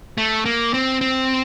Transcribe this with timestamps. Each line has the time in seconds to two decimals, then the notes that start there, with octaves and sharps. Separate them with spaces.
0.18 A3
0.45 A#3
0.74 C4
1.01 C4